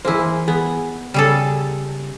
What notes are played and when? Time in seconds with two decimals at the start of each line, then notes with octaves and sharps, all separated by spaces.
0.05 E3 A#3 E4 G#4 C5
0.48 B3 G#4
1.14 C#3 G3 G#4 A4